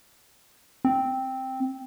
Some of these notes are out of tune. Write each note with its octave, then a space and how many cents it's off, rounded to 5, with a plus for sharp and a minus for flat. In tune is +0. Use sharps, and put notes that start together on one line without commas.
C4 +0